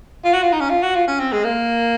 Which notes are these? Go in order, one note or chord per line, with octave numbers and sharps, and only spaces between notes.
F4
F#4
F4
D#4
C#4
F4
F#4
F4
C#4
C4
G#3
A#3